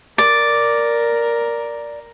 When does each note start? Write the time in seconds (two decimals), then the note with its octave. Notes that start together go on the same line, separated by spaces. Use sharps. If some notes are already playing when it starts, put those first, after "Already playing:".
0.18 A#4 D5